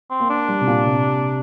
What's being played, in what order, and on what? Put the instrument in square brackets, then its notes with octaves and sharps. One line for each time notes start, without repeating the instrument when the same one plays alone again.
[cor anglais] C4
[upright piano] A#3
[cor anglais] D4
[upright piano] G3
C3
A#2
C3